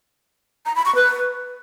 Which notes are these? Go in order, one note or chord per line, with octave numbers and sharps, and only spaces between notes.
A#5
B5
C#6
B4